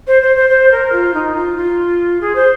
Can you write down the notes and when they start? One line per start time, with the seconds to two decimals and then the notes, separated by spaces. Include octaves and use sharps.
0.07 C5
0.22 C5
0.36 C5
0.49 C5
0.71 A#4
0.92 F4
1.14 D#4
1.35 F4
1.57 F4
2.21 G#4
2.35 C5